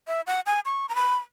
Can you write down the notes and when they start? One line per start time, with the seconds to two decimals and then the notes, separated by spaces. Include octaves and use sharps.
0.07 E5
0.27 F#5
0.46 G#5
0.66 C#6
0.89 A#5
0.95 B5